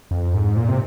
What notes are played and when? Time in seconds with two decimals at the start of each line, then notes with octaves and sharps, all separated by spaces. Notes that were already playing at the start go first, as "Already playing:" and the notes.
0.11 F2
0.34 G#2
0.57 A#2
0.68 C3